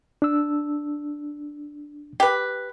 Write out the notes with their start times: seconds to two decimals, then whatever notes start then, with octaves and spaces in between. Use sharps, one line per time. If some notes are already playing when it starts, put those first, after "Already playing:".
0.22 D4 E6
2.20 G4 B4